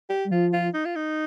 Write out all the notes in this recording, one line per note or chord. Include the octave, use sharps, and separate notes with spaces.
G4
G3
F3 F4
F4
D#4
F4
D#4